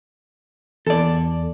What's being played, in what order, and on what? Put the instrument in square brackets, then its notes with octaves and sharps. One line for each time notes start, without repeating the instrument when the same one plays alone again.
[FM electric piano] E2 [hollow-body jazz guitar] A4 D5